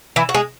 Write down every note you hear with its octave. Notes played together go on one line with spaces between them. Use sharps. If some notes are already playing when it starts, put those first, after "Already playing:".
E3 E4
F#4
G#3 G#4